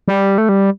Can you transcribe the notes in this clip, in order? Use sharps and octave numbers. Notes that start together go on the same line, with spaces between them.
G3
A3
G3